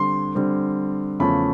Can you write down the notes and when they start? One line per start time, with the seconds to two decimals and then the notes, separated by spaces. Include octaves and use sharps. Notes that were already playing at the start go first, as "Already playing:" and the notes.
Already playing: D3 G3 C4 C6
0.35 D3 G3 C4
1.20 E2 C#3 F3 A3 C#4 B5